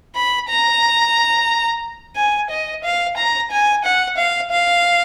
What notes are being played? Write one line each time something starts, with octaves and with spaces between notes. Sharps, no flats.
B5
A#5
G#5
D#5
F5
A#5
G#5
F#5
F5
F5